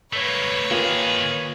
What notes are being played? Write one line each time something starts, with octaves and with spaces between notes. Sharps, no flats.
A3 A#3 B4 C#5
D#3 A#3 F4 G#4